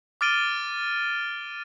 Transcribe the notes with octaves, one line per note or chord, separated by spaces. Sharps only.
D6 F6 A6 D7 D#7 G7